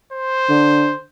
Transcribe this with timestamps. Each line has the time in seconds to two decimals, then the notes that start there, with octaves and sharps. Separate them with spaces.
0.13 C5
0.49 D3